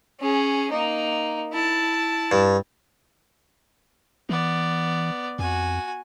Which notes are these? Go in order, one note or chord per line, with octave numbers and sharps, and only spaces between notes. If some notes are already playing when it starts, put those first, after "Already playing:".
C#4 G#4
A#3 D#4
E4 A5
G2
E3 B3 D5
F2 F#4 G#5